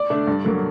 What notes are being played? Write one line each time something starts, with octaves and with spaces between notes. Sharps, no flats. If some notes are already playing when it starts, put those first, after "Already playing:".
Already playing: D5
D3 A3 D4
G2
D3 F#3 A#3